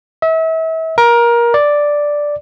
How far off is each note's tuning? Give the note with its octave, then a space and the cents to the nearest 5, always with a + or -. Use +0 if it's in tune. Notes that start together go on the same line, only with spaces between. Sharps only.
E5 -35
A#4 +20
D5 +0